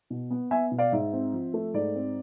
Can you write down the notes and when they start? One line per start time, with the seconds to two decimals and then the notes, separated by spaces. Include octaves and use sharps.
0.10 B2
0.31 B3
0.51 B3 E5 G#5
0.71 B2
0.78 D5 F5
0.92 G#2 E5
1.13 C4
1.33 F3
1.54 A3
1.74 G#2 D5
1.95 C4